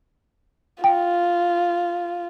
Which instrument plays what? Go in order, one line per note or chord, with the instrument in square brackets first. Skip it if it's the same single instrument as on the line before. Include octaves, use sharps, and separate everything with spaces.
[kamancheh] F4 [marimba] G5